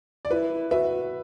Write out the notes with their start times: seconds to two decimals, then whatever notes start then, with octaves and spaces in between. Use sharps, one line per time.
0.25 D5
0.30 E4 B4
0.71 F#4 B4 E5